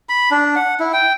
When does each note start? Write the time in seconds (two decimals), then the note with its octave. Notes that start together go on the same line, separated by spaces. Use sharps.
0.09 B5
0.31 D4
0.56 F#5
0.80 E4
0.93 G5